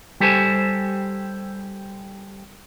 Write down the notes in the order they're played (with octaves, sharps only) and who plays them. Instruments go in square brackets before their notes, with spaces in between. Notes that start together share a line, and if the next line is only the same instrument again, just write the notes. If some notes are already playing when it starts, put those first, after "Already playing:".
[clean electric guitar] G3 G4 A4 C5 G#5